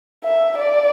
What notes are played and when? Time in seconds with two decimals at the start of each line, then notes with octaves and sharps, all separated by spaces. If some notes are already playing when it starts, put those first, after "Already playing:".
0.24 E5
0.57 D5